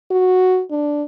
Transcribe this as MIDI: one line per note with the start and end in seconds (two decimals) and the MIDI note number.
0.11 0.62 66
0.71 1.03 62